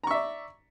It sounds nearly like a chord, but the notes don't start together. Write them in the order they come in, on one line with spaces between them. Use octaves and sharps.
A#5 C#6 E5 D5